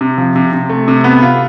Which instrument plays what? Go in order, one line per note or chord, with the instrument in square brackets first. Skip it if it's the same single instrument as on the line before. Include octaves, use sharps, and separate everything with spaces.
[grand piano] C3
F3
C3
C3
A3
C3
B3
F4